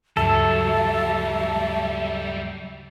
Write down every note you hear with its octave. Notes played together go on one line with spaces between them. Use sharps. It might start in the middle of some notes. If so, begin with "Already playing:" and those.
D2 G2 C#3 F#3 G3 A4 E5